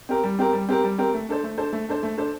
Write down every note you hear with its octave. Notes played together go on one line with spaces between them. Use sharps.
C4 G4 A#4
G3
C4 G4 A#4
G3
C4 G4 A#4
G3
C4 G4 A#4
A3
D4 A4 C5
A3
D4 A4 C5
A3
D4 A4 C5
A3
D4 A4 C5